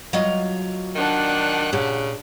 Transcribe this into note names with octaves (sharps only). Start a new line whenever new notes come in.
F#3 F4 D#5
D#3 D4 F#5 F#6
A#2 C#3 G4